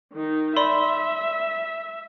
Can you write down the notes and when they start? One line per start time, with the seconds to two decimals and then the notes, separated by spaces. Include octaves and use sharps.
0.13 D#3 D#4
0.56 D5 E5 B5 C6